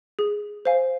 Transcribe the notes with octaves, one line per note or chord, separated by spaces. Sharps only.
G#4
C5 F5 G#5